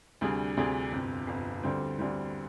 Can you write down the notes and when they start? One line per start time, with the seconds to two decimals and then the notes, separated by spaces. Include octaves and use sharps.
0.21 D2 C3 G3 D4 G#4
0.57 D2 C3 G3 D4 G#4
0.92 G1 F2 C3
1.27 G1 F2 C3
1.63 D2 D3 G3 C4
1.99 D2 D3 G3 C4